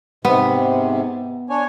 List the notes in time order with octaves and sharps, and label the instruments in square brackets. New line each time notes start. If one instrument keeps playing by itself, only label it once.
[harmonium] G#2 C3 [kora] B3
[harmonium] D4 C#5 G#5